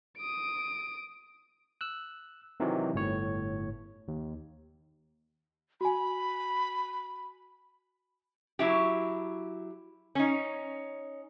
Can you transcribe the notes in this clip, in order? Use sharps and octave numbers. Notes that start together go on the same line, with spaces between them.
D#6 D7
E6 F#6
C3 D#3 E3 F#3
G1 A2 C#5
D#2
F#4 G#5 B5
F#3 E4 G4
C#4 D#4